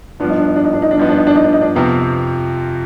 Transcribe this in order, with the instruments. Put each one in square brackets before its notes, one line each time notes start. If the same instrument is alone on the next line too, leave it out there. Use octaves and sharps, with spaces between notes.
[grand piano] G2 F3 B3 [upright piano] D4
[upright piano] D#4
D4
D#4
D4
D#4
D4
D#4
D4
[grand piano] G2 F3 B3 [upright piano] D#4
[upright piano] D4
D#4
D4
D#4
D4
D#4
D4
[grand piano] F2 C3 F3 [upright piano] B3